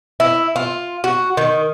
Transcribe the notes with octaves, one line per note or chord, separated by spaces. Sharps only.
E4
F4
F#4
D#3